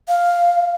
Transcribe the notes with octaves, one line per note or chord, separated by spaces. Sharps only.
F5